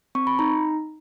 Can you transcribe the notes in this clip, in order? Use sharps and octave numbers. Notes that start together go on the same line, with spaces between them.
C4 C#6
B5
D#4 A#5